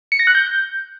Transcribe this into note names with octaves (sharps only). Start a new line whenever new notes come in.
C#7
A#6
F#6
G6